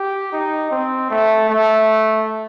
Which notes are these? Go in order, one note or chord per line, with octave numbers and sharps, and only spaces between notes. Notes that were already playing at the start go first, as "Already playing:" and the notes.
Already playing: G4
D#4
C4
A3
A3